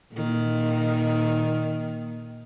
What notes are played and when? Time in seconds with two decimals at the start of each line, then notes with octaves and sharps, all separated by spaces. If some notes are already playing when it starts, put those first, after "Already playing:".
0.12 A#2 D#3